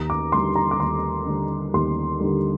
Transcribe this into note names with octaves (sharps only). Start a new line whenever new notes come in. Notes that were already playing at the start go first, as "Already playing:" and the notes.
Already playing: D#2 A#5
D6
D3 G3 C6
A#5
D6
D#2 C6
D3 G3
D#2 C6
D3 G3